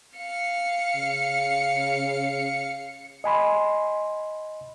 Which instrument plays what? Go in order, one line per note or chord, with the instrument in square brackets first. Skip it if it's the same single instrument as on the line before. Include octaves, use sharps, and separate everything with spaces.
[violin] F5 C#7
[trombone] C#3
[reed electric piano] D#5 G#5 B5 C6